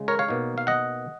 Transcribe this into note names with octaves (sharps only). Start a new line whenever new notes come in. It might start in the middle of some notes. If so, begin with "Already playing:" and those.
Already playing: C#3 G#3
A#4 C#5
C#5 F5
B2 A#3 D#4
F5
D#5 F#5